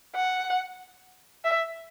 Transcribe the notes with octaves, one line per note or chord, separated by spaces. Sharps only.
F#5
E5